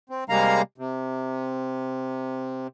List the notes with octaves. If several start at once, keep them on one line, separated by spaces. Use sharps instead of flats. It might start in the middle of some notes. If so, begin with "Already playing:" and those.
C4
C3 G3 G#3 A#3 F5 A#5
C3